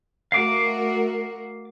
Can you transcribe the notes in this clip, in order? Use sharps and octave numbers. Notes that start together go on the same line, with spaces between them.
A3 F#4 A#4 F5 D6